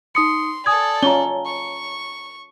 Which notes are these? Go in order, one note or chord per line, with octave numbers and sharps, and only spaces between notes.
D#4 C6 D#6 C#7
A4 D5 G#5 D#6 G#6
C#4 F4 A#5 G7
C#6